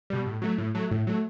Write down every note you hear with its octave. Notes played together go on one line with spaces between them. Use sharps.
B2 G3
A2
F#3 A3
A2
F#3 A3
A2
F#3 A3